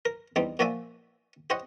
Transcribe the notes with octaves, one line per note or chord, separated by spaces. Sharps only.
A#4
E2 G3 C4 D#4
A#2 F3 F#4 D5 E5 G#5
G4 C5 C#5 D#5 F#5